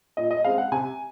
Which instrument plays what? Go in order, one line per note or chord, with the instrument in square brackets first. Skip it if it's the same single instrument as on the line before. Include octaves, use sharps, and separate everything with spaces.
[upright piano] A#2 D#5
D#5
G#3 C4 F5
F#5
C3 G#5